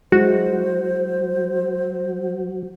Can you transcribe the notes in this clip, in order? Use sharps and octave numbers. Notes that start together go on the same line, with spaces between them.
F#3 G#3 E4 F#4 C5